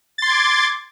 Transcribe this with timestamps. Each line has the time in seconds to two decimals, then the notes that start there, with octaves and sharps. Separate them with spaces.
0.18 A6
0.22 C6
0.26 G#6
0.30 D6